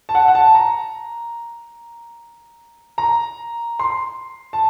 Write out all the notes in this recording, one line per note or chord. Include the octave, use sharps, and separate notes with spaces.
A5
F#5
F#5
A5
A#5
A#5
C6
A5